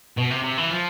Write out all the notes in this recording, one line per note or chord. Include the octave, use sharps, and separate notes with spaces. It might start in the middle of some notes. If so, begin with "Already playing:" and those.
B2
C3
C3
E3
F3